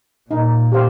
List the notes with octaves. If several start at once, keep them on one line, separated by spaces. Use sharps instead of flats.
A#2 D#4
G4 C5 F5